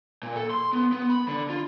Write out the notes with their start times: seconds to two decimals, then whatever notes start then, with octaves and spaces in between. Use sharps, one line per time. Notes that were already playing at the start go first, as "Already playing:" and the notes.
0.23 A#2
0.36 A4
0.50 C6
0.73 B3
0.92 B3
1.10 B5
1.28 D3
1.50 F4